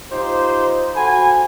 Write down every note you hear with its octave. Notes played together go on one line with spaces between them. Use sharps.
D#4 F4 G4 C5
F#4 A4 C5 F#5 G#5 B5